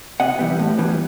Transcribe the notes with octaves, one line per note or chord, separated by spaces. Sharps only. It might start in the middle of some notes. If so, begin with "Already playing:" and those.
C3 D#5 F#5
E3 G3 B3
A2
E3 G3 B3